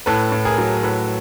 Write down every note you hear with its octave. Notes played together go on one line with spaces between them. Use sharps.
A2 A4 B4
A2
G#4 A#4
F#3
A2 A4 B4